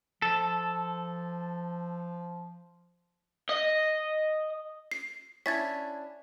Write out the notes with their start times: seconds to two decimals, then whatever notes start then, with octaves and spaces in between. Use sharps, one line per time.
0.22 F3 A4
3.49 D#5
4.91 C7
5.46 C#4 D4 E4 G#6 A6 B6